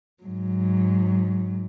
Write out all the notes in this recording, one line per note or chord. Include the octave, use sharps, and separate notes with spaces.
G#2 F#3